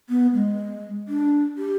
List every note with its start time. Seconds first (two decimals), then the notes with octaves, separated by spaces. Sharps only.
0.10 B3
0.34 G#3
1.08 D4
1.58 G4